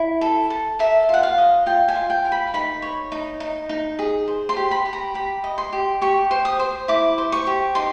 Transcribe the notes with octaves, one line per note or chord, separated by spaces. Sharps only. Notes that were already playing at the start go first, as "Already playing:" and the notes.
Already playing: E4
A4
A4
A#4 E5
F4 F#5
F5
D#5
F4 G5
G#5
F4
G5
A#4
B5
D#4 B5
C#5
D#4
D#4
D#4
G#4
C5
C6
G4
B5
G4
A#5
G4 B5
D#5
C6
G4
G4 C#6
C5
D#6
C5
E4 D6
C5
C#6
G4
D#4 C6